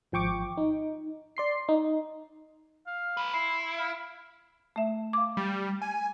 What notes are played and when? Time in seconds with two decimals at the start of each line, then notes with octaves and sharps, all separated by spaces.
0.12 G#1 F3 G5 C#6 D6
0.58 D#4
1.37 D5 C6 C7
1.69 D#4
2.87 F5
3.17 F4 B4
3.33 E4 C6
3.78 F5
4.76 A3 E5
5.13 F5 D6
5.37 G3
5.82 G#5